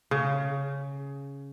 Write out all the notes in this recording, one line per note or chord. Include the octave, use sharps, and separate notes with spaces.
C#3